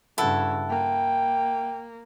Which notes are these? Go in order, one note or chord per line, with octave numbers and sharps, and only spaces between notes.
G2 C#3 E4 A4 F#5
A#3 G5